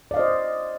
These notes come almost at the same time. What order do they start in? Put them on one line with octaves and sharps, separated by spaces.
D5 F5 D#5 C5